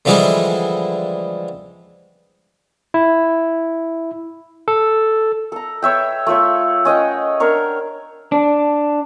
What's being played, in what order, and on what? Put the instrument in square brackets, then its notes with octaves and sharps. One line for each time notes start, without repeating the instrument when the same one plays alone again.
[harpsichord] D3 E3 F3 G3 G#3 E4
[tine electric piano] E4
A4
[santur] A4 A#5
B4 C#5 E5 G5
A3 F4 C#5 E5
C#4 D#5 F#5 G5
D4 A#4 C#5
[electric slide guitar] D4